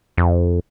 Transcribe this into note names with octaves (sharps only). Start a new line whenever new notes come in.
F2